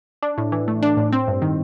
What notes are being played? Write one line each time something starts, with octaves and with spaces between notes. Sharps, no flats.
D4
A2
E3
A3
D4
A2
C4
G2
D#3